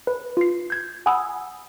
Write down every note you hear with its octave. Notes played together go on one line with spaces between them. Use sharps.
B4
F4 C7
G6 G#6
F#5 G#5 B5 D#6 E6